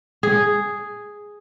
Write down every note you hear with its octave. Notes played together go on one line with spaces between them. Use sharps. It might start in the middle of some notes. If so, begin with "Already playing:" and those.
G#4